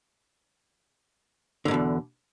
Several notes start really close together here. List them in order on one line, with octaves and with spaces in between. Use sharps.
D3 G#2 B2 E2